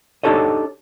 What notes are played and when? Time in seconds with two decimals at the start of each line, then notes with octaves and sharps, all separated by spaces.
0.24 D4 D#4 G4 A4 C#5 D#5